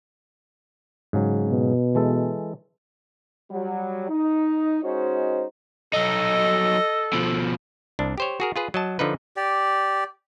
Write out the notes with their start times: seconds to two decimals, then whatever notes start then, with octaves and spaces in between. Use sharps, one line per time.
1.13 G#2 C#3 F#3
1.48 B2
1.95 E3 G#3 A4
3.51 F#3 G3
4.09 D#4
4.82 G#3 C#4 D#4 F#4 C5
5.93 F#3 D#4 A4 D#5
7.13 B2 F3
7.99 C2 D4
8.18 G4 C5 C#5
8.40 F#4 G#4 A#4
8.56 F4 G#4 B4
8.74 F#3 D#5 A5
8.99 D3 F3 D#4 B4
9.36 G4 D5